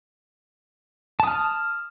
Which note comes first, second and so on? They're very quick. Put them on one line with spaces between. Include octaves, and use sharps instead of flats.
A5 D#6 F6